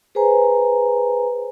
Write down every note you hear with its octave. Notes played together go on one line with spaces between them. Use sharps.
G#4 B4 C5 G#5 A#5